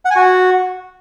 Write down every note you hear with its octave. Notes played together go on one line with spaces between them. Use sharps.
F#5
G#5
F#4